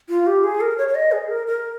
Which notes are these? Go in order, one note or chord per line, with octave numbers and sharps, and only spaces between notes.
F4
G4
G#4
A#4
C#5
C#5
D#5
G#4
A#4
A#4